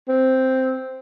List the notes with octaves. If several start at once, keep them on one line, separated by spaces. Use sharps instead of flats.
C4